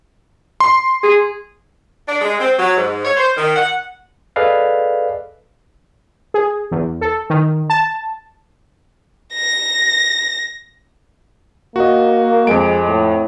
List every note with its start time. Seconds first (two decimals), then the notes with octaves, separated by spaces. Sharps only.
0.60 C6
1.03 G#4
2.08 D4
2.22 G#3
2.39 C4
2.57 F#3
2.77 G#2
3.05 C#5
3.17 C5
3.36 D#3
3.56 F#5
4.36 G#4 A4 B4 D5 D#5 F5
6.34 G#4
6.72 E2
7.01 A4
7.30 D#3
7.70 A5
9.34 A#6
11.76 A#3 F#4 D#5
12.47 F2 G#3 D7
12.88 A2